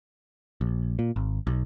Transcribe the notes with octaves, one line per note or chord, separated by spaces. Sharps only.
A#1
A#2
G#1
B1